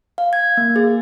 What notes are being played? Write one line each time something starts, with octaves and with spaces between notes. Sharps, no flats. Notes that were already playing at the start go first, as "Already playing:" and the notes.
F5
G#6
A#3
G#4